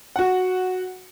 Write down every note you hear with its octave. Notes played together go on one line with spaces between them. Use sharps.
F#4 F#5